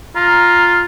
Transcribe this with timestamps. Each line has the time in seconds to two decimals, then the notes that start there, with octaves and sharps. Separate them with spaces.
0.16 F4 A#5